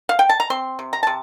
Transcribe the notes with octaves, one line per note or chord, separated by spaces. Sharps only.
F5
G5
A5
A#5
C4 C6
C3
A#5
C3 A5